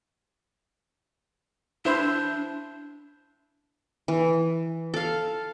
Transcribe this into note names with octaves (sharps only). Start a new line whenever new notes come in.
D4 E4 C5
E3
A4 F5